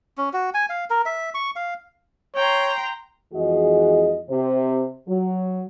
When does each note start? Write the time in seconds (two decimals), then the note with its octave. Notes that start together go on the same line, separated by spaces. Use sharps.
0.18 C#4
0.33 F#4
0.54 G#5
0.69 F5
0.90 A#4
1.05 E5
1.34 C#6
1.56 F5
2.35 C#5 G5 A#5 C6
3.33 F2 E3 G#3 F#4 G#4 D#5
4.28 C3 C5
5.08 F#3